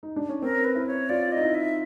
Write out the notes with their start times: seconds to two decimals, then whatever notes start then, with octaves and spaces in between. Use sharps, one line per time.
0.03 D#4
0.16 D4
0.29 C#4
0.42 C4 A#4
0.64 B4
0.75 E4
0.87 C#5
1.09 F4 D5
1.32 D#4 D#5
1.42 E4
1.54 E5